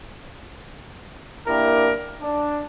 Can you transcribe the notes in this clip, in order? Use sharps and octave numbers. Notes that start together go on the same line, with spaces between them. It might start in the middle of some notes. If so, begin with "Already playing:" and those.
A#3 D4 E4 G4 A#4
D4